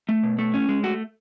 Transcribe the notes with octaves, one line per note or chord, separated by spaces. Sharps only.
A3
B2
A3
C#4
G#3
A3 F#4